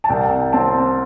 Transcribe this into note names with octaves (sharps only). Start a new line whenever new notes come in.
A5
C2 G5
C4 A5